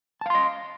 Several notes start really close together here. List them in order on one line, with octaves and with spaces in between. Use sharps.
A5 F5 C6 D#5